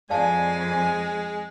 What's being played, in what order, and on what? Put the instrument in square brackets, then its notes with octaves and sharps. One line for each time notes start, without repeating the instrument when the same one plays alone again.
[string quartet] F2 [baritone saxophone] G#3 [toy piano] D5 F5 A5 [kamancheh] G#5